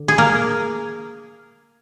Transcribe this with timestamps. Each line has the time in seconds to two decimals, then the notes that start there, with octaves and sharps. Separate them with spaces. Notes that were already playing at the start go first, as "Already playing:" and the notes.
Already playing: D3
0.08 G#4
0.18 A#3 A#4